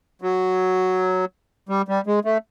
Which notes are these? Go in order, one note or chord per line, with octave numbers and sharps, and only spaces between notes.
F#3
G3
G3
G#3
A3